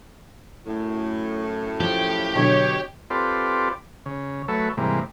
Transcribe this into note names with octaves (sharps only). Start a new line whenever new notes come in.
F#2 A2
F3 G4
B2 D3 F#3 C#5
C4 F4 G4 A4 B4 D5
C#3
F#3 A3 A4 B4 C#5 E5
G#2 C3 E3 G3 A#3